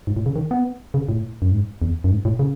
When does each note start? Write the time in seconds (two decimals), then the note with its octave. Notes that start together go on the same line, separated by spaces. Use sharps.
0.07 G#2
0.16 A2
0.26 C#3
0.36 D#3
0.51 B3
0.94 C#3
1.09 A2
1.42 F#2
1.52 G#2
1.82 E2
2.04 F#2
2.11 G#2
2.25 A2
2.39 C#3